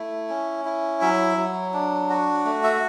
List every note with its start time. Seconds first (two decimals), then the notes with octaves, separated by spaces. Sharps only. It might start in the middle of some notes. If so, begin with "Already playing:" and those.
Already playing: A3 E4
0.30 C#4
0.65 E4
1.01 F#3 E5
1.38 F#3
1.74 D4
2.10 F#4
2.45 A3
2.64 E5